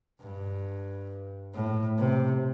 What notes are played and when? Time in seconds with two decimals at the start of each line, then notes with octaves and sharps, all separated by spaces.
0.20 G2
1.54 A2
1.99 C3